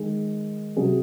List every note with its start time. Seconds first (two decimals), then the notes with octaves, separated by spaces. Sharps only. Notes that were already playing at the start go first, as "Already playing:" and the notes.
Already playing: D#3 G#3 G#4
0.76 C3 F#3 C#4 G#4